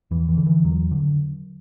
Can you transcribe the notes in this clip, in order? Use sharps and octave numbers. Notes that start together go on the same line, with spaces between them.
E2 E3
E3
D3
E3
E2 F#3
D3